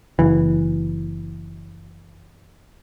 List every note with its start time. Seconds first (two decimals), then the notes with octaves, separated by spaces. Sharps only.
0.19 F#1 E3